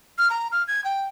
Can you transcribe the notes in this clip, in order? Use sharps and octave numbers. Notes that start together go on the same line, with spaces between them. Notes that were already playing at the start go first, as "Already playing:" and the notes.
F6
A#5
F6
G#6
G5